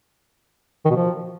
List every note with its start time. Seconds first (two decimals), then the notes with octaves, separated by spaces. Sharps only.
0.85 D#3
0.90 B2
0.96 F3